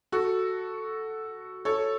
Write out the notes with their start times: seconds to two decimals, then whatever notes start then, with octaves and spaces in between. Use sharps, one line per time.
0.12 F#4 A4
1.65 A4 C#5